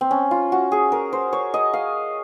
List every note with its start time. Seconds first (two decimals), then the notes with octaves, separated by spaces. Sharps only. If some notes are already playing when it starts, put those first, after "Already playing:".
0.01 C4
0.11 C#4
0.31 F4
0.52 F#4
0.72 G#4
0.92 A#4
1.13 C5
1.33 C#5
1.54 D#5
1.74 F5